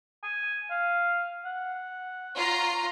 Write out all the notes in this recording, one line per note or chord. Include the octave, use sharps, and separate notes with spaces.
G#5
F5
F#5
F4 C#5 A#5 C7